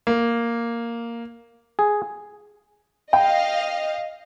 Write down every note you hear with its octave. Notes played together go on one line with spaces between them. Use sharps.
A#3
G#4
D#5 F5 G5